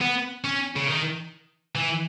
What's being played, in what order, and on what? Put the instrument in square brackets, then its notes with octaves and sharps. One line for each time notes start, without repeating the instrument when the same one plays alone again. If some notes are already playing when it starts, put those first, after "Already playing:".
[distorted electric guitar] B3
C#4
C#3
D#3
E3